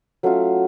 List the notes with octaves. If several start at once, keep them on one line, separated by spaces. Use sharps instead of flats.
F#3 A3 C#4 F4